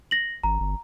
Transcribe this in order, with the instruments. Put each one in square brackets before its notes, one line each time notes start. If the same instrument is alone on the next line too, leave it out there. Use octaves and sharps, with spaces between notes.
[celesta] A#6 F#7
[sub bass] G#1 [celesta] A#5
[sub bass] G1